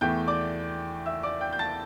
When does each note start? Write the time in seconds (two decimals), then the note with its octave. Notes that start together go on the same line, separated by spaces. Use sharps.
0.01 E2 E3 A3 G5 G6
0.28 D5 D6
1.06 E5 E6
1.23 D5 D6
1.41 G5 G6
1.53 G6
1.59 A5 A6